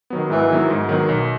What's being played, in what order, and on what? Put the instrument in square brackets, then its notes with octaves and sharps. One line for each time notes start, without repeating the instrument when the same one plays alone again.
[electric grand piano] D#3 F#3 B3
[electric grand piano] G#2 [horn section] E3
[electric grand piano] D#3 F#3 B3
G#2
D#3 F#3 B3
B1